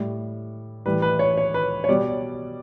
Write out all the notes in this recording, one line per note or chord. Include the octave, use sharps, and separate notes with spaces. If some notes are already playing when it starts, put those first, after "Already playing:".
Already playing: A2 G3
A2 E3 G3 B4
B4
C#5
C#5
B4
C#5
B2 G3 D5